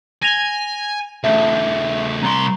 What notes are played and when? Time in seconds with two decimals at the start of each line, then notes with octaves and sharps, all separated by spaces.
0.23 G#5 A#6 F7 G7
1.24 C#3 A3 E5
2.22 C2 A#5 C6